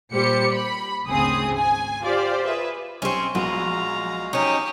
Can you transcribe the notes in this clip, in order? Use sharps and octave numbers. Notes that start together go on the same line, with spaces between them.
A#2 G3 G4 C5 C#7
B5
G#1 D2 C#3 C4 G#4 D#6
G#5
F4 G4 C5 D5
G#4 B4 E5
B1 C4 C#4 G4 C#6
A#1 F#3 G#3 B3 F#4 F5 A#5 C6
F#3 C#4 D#4 G4 C#6 D#6